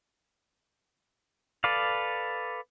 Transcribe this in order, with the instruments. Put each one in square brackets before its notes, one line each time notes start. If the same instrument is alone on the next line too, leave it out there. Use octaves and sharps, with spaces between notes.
[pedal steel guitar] A4 B4 D5 F5